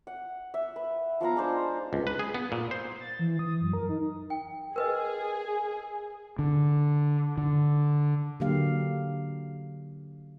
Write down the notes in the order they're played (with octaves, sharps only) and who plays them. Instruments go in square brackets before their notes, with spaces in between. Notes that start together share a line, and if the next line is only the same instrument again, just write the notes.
[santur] F#5
E5
B4
F3 B3 F5 A#5
G#3 D4 D#4 C5
[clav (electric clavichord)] C#2
B4
G#4
B3
A#2
C5
[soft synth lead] A6
E3
D#6
F#2
A#4
D#4
[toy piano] G5
[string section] G#4 [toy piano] A#4 B4 D#5
[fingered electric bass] D3
D3
[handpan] D3 F#3 A#3 G4 F5